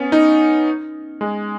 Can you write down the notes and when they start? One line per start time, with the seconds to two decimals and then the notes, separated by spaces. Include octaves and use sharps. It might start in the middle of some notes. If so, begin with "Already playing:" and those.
Already playing: B3 C#4
0.12 D#4
1.21 G#3